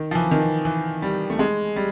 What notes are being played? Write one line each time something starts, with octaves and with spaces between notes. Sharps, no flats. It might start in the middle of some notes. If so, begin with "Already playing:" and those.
Already playing: D#3
F3
E3
D#3
E3
E3
G3
A3
G#3
G3